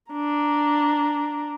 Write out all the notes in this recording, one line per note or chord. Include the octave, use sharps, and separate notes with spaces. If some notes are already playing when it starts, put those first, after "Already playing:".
D4 A#5